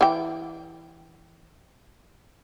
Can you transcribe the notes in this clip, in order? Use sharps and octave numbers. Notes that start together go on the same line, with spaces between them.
E3 G5